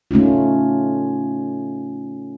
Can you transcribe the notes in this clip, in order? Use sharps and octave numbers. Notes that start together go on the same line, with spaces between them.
A3 C#4 D#4 F4